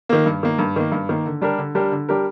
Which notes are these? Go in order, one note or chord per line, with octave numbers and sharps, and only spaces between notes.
D#3 A#3
G2
D#3 A#3
G2
D#3 A#3
G2
D#3 A#3
D3
G3 D4 G4 A#4
D3
G3 D4 G4 A#4
D3
G3 D4 G4 A#4